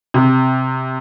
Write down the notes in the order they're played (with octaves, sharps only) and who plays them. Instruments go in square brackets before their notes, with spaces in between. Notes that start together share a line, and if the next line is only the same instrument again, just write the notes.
[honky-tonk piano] C3